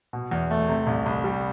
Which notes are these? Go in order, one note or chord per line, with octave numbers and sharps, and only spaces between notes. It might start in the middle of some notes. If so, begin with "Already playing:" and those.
B2
E2
A3
C3
C2
C2
G3